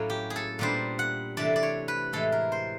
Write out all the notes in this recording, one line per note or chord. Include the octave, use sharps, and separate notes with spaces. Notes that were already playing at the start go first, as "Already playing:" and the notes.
Already playing: A2 F#3 A#3 C#4
G4
G#4
A4
A#2 G3 B3 D4 C5
F#5
C3 E3 A3 D4 D5
D5
C#5
B4
A2 E3 G#3 A4
A#4
C5